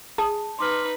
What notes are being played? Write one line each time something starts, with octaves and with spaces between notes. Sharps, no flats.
G#4 A5
D#4 B4 C6 D6 F6